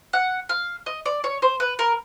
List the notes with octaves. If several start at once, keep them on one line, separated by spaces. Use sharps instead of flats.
F#5
F5
D#5
D5
C#5
C5
B4
A#4